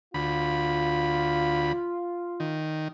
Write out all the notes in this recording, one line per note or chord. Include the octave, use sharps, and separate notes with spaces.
D2 F4 B5
D#3